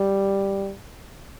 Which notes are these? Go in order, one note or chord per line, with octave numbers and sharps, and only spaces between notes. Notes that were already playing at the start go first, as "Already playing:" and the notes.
Already playing: G3